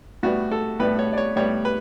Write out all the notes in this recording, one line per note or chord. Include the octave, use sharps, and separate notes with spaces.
A2 G3 B3 F#4
A4
A2 G3 B3 B4
C#5
D5
C#5
A2 G3 B3 C#5
B4